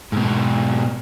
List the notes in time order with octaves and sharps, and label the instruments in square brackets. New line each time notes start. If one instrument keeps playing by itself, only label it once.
[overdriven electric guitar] G#2 B2